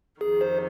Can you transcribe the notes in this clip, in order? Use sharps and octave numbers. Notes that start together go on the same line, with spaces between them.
F2 C3 D#3 G#4
C5